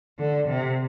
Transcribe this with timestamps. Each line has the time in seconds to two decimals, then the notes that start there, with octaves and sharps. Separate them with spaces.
0.19 D3
0.48 C3